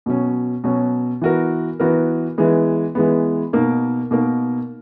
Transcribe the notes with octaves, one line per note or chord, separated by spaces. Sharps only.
B2 F#3 C#4
B2 F#3 C#4
E3 B3 F#4 A#4
E3 B3 F#4 A#4
E3 G#3 B3
E3 G#3 B3
B2 A#3 D#4 A#4
B2 A#3 D#4 A#4